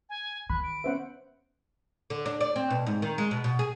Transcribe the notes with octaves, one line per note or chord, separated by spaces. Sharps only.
G#5
D#3 B5 F#6
D7
B3 C#4 B4 C5 E5 F#5
D3
D4
D5
C4
B2
G#2
D#3
G#3
B2
B2
G#4